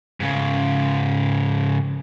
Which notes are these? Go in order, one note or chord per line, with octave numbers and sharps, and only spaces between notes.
G#2 C#3